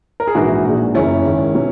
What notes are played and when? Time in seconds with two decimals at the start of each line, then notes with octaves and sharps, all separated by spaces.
0.20 A#4
0.27 G#4
0.35 A#1 G#2 E3 G#3 D#4 F#4
0.65 A#1 A#2 G#3
0.94 F#1 E2 C#3 F#3 C#4 E4
1.25 G#1 G#2 D#3
1.55 B2 F#3